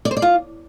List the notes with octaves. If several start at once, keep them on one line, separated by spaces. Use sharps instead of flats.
D5
C5
D5
F4